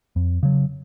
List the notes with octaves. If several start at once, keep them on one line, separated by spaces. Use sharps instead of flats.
F2
C#3 F#3